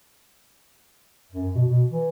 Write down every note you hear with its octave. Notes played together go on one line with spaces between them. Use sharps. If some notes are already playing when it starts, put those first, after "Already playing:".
F#2
B2
B2
E3